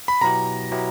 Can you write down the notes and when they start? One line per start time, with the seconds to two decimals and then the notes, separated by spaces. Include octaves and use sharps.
0.08 B5
0.21 B2 F#3 B3 E4 G4 A#5
0.72 B2 F#3 B3 E4 G4